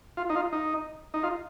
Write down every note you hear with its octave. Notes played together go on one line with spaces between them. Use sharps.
F4
D#4
F4
D#4
D#4
F4